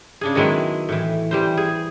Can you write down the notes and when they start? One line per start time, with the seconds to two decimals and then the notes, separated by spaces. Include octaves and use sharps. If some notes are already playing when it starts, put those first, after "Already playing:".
0.21 C#3 D4 G#4
0.35 D#3 F#3 G#3 B3 E4
0.89 A2 E3
1.31 E3 G3 C5
1.57 G#4